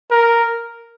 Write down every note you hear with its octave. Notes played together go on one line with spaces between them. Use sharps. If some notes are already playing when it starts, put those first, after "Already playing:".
A#4